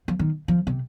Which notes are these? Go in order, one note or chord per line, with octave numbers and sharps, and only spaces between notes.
F3
D#3
F3
C3